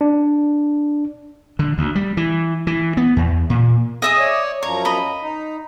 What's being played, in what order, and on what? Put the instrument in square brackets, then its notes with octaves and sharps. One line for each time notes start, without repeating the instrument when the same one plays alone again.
[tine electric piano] D4
[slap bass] D3
D2
G3
E3
E3
B3
E2
A#2
[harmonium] G#4 [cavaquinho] D#5 E5 D#6
[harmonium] C#5 D5
[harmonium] F#2 F3 A#5 [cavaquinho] C#5
[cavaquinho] D#5 B5
[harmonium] D#4